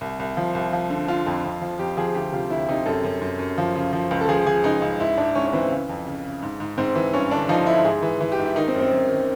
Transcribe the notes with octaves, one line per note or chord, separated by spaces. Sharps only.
C2
C2
F3
C2
F3
D3
D3 F4
F2
F2
F3
F2 G4
F3 G#4
D2 G4
C3 F4
D2 E4
C3 D#4
F#2 A4
F#2
F#2
F#2
F3
C#3
F3
C#2
A4
F3 G#4
F3 G#4
C#2 D#4
C#2
G#2 E4
G#2 D4
G#2 C#4
C#4
E3 C4
C#3
F2
C#3
C#3
G#2
G#2
G#2 C4
E3
G2 C#4
D3 D4
F3 D#4
D3 E4
G#2 G#4
E3
E3
G4
G#2
E4
D#3 D#4
C4
F#2
C4
F#2
D#3